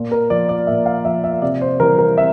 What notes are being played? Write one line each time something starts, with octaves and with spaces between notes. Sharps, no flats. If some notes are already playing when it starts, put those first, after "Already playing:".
Already playing: A#2
A#4
F3 D5
D5
A#2 E5
F5
F3 E5
E5
C3 D5
C5
E3 G3 A#4
A#4
C3 E5